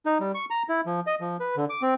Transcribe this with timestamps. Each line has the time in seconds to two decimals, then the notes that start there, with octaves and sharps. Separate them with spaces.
0.06 D#4
0.20 G3
0.35 C#6
0.50 A#5
0.69 E4
0.86 F3
1.07 D#5
1.20 F3
1.40 B4
1.56 D3
1.70 D6
1.82 C4